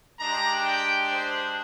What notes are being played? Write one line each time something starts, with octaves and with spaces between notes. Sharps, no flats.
G#3 D4 G4 A#5
G5
C5